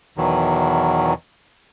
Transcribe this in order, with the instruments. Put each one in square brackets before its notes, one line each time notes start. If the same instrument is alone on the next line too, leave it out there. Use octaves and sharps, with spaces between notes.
[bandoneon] E2 B2 D#3 E3 F#3